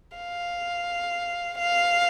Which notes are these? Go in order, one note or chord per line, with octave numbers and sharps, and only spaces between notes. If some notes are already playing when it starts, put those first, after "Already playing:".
F5
F5